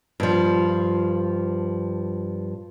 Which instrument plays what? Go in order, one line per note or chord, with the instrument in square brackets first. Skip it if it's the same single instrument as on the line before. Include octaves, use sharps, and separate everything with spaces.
[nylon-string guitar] G2 F3